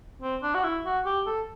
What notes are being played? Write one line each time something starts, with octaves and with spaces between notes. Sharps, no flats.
C4
D4
F#4
E4
F#4
G4
A4